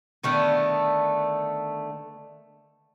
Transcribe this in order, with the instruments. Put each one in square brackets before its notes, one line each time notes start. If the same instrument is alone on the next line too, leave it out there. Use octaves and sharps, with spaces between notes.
[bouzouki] D3 D#3 A3 B3